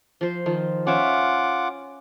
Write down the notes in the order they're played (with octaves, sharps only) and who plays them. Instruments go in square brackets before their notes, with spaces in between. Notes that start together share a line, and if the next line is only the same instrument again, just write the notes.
[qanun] F3 C5
D#3 F3
[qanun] C#4 C#5 E5 [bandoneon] F4 F#5 D6